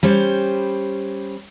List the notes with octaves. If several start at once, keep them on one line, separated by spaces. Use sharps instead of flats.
G3 C#4 C5